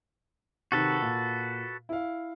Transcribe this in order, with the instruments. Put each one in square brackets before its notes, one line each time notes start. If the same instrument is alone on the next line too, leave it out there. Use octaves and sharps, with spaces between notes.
[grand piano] C3 D#3 [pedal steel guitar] F#4 A4 B4
[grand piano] A#2
E4 F5